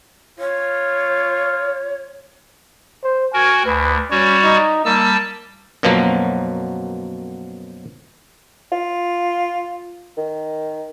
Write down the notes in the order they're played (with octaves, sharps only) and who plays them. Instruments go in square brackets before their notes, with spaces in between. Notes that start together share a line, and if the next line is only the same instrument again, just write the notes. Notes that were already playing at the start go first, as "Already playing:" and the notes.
[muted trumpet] F4 [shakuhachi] C#5
[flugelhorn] C5
[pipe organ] F#4 A#4 [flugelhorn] G#5
[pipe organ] D2 [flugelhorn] B4
[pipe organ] G3 F#4 C#5 [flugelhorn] C#4
[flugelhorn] D#4
[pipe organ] G3 A5 E6 [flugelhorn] A#3
[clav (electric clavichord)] F#2 B2 F3 F#3 A#3
[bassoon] F4
D#3